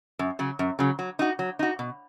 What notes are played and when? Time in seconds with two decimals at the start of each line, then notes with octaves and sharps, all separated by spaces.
0.19 F#2
0.39 C#3 F#3
0.59 F#2
0.79 C#3 F#3
0.99 F#3
1.19 D#4 F#4
1.39 F#3
1.59 D#4 F#4
1.79 B2